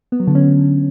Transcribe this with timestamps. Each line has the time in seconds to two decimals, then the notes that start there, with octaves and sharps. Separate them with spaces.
0.12 B3
0.20 F#3
0.27 D3
0.35 C#4